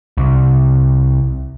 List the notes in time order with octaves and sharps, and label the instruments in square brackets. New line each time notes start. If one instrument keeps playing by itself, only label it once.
[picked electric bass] C2